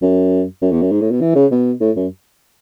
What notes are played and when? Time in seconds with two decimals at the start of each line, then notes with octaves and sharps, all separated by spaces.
0.02 F#2
0.62 F#2
0.72 E2
0.81 F#2
0.92 G#2
1.01 A2
1.11 B2
1.21 E3
1.35 C#3
1.51 B2
1.80 A2
1.96 F#2